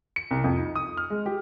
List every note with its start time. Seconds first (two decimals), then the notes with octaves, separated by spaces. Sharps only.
0.16 C#7
0.31 C2
0.44 F2
0.59 D#4
0.75 D#6
0.97 F6
1.10 G#3
1.26 G4